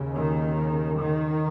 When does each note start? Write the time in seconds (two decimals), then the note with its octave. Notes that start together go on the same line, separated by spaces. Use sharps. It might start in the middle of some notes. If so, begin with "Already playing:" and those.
Already playing: D#2 C#3
0.15 D#3
0.98 D#3